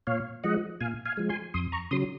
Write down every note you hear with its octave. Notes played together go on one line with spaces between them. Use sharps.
A#2 C#5 F5
F3 G#3 D#5 F#5
A#2 F5 G#5
F5 G#5
F3 G#3
G#5 C6
F2 C6 D#6
A#5 C#6
C#3 F#3 C6 D#6